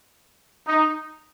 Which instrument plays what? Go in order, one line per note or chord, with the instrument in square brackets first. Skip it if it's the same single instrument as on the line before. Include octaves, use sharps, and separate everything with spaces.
[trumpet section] D#4